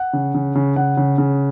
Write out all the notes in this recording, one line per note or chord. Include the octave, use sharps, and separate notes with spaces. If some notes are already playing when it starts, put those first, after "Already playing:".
Already playing: F#5
C#3
C#3
C#3
C#3 F#5
C#3
C#3